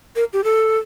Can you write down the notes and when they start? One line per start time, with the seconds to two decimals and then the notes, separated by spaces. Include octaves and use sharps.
0.16 A#4
0.33 G4
0.44 A4